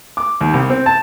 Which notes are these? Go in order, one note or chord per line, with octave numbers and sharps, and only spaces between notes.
D6
D#2
C2
C4
A5